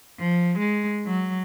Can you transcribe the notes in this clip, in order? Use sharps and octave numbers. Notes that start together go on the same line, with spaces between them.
F3
G#3
F#3